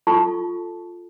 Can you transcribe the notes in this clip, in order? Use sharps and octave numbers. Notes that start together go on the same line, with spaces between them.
F4 A4 A5 C#6